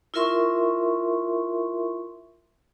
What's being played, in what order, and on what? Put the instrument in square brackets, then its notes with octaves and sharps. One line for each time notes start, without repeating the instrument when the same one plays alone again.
[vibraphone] E4 F4 A#4 E5 C6 C#6